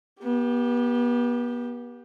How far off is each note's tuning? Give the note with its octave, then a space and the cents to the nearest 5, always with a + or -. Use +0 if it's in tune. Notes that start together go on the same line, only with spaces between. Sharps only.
B3 -35 G4 +0